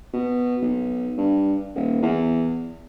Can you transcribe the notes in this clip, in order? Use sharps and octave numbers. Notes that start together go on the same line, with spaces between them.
B2
B1
G2
D#1
E2